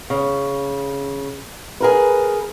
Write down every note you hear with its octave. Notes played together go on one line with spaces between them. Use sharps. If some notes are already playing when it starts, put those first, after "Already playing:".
C#3
G#4 A#4 B4